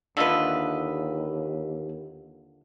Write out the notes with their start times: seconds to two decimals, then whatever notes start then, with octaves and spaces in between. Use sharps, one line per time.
0.17 D#2 D3 D4 F4 B4 D#5 E5